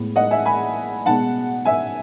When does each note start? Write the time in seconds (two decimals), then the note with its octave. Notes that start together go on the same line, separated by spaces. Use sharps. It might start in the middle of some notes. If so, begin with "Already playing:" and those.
Already playing: A2 G#3 B3
0.16 D#5 F#5
0.31 E5 G#5
0.45 G#5 B5
1.06 B2 G#3 B3 F#5 A5
1.65 E5 G#5